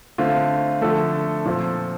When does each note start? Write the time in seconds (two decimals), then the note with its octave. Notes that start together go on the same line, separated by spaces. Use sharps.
0.18 D3 A3 C4 F4
0.81 D3 F3 A3 A4
1.45 A#2 F3 C4